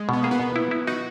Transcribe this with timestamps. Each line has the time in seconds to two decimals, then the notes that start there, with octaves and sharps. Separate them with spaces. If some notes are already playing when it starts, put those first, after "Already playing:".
Already playing: G#3
0.09 B2 B3
0.23 A#3 G#4
0.31 B3
0.40 B2
0.56 E4
0.71 E4
0.87 D#4 F#4